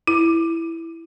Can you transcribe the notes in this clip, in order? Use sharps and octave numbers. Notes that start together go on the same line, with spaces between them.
E4